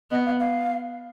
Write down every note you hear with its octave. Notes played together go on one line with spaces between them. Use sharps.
B3 D#5
F5
F5